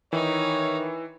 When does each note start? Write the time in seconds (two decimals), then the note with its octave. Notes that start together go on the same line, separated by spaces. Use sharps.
0.13 D#3 E3 D#4 C#5